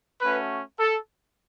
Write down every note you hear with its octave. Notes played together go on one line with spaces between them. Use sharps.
A3 C#4 F#4 B4
A4